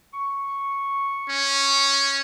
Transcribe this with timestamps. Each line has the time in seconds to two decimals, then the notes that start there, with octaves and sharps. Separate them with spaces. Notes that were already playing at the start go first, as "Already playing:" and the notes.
0.13 C#6
1.29 C#4